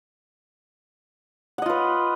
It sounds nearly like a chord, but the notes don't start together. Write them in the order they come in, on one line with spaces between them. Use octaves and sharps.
F#5 D#5 F4 B4